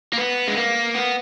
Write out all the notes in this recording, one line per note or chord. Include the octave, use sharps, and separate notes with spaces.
A#3
B3
G#3
A#3
B3